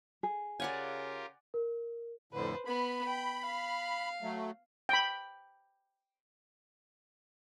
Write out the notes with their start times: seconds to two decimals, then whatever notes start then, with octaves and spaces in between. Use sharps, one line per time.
0.23 G#4
0.60 C#3 F4 G4 A#4 D5 F#5 G#5
1.54 A#4
2.33 F2 A2 D3 B4 C5
2.66 B3 B5
3.07 G5
3.45 F5
4.22 F#3 A3
4.89 G5 B5